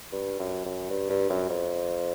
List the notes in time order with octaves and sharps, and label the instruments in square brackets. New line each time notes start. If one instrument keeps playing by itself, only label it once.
[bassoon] G2
F#2
F#2
G2
G2
F#2
F2